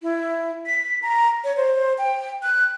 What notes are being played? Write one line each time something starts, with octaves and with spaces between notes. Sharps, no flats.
E4
B6
A#5
C#5
C5
G5
F#6